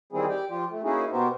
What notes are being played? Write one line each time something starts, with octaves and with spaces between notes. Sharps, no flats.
D#3 E3 G3 C4 E4 G#4
G4 D5 G5
F3 F4 G4
A3
A#3 C#4 D#4 E4 F#4 G#4
B2 B3 F#4 G4 A#4 C5